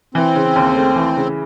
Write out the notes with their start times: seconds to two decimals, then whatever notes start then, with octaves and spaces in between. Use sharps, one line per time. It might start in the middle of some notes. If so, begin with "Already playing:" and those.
0.15 E3 C4
0.35 C#3
0.56 D#2
0.75 A3
0.96 E3
1.16 C#3